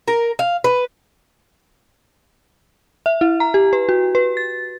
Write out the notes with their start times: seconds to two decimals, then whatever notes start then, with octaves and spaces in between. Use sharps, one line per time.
0.08 A#4
0.39 F5
0.64 B4
3.06 E5
3.21 E4
3.40 A#5
3.54 G4
3.73 B4
3.89 F#4
4.15 B4
4.37 A6